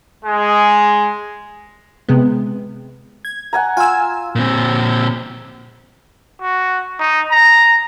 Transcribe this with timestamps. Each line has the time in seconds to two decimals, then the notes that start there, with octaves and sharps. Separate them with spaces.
0.25 G#3
2.08 C3 G#3 B3
3.25 G#6
3.53 F#5 G#5 A#5
3.77 F4 G#5 E6
4.35 A#2 C4
6.41 F#4
7.00 D#4
7.31 A#5